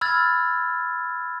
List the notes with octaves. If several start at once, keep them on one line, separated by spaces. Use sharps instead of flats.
B5 E6 F6 G#6 A6